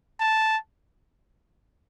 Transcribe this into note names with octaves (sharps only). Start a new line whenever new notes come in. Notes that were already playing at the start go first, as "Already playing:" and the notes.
A5